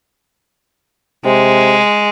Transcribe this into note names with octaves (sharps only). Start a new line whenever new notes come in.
C3 G#3